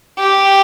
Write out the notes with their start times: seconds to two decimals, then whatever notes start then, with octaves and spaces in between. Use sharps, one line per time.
0.19 G4